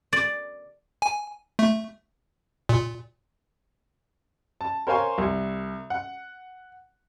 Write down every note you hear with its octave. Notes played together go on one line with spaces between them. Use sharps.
D5
G#5
A3
A#2
A5
A#4 C5 C#5 F5 G#5 C6
C2
F#5